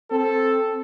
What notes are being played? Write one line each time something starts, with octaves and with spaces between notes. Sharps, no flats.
C4 A4